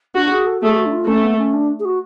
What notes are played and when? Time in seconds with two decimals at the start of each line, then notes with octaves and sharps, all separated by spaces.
0.16 D4 F#4
0.31 G#4
0.47 A4
0.62 A3 G#4
0.77 F#4
0.86 D4
0.92 F4
1.07 A3 C#4
1.24 B3
1.38 C#4
1.53 D4
1.80 G#4
1.85 F#4